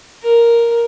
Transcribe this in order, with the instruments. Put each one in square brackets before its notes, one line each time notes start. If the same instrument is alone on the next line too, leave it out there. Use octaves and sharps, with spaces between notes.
[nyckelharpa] A#4